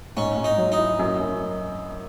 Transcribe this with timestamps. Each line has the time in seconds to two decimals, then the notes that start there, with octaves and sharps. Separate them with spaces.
0.17 G#2 C#4
0.37 G#2
0.44 D#4
0.58 F#3
0.72 D#4
0.78 E4
0.99 F#2
1.20 F#2